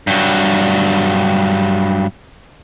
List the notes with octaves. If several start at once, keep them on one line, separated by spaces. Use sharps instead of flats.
G2 F#3